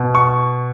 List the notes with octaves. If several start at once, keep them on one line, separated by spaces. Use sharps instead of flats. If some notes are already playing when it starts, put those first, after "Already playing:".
Already playing: B2
C#6